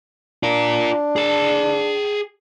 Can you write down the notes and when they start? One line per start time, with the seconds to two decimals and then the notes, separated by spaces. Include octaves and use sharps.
0.43 D4 F4 A#4
1.16 G#4 A5